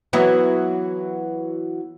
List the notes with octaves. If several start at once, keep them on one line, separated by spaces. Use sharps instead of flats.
E3 F#3 B3